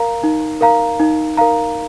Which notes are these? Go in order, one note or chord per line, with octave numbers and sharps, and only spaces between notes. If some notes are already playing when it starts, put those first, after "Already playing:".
Already playing: A#4 F5 A#5
D#4
A#4 F5 A#5
D#4
A#4 F5 A#5